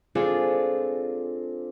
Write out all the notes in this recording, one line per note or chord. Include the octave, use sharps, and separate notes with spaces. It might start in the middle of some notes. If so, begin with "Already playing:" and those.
C4 D4 F4 G#4 A4